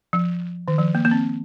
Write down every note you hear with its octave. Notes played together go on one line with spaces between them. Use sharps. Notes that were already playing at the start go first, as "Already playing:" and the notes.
F3
D#3
F3
A#3
A#3
C4